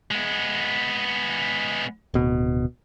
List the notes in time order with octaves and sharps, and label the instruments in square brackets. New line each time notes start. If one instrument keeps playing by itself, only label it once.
[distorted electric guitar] G#3 B3
[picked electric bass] D1 B2